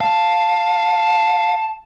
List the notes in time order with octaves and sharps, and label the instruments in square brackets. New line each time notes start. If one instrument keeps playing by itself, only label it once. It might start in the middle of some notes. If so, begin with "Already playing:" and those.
[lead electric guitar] F5 [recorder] A5